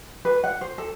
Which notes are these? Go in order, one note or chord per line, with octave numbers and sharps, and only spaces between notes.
B4
F#5
C5
A4